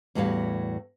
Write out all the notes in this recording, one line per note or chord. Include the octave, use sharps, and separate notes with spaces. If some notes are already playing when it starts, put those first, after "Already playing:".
E2 A2 G3 F#4 C#5 F5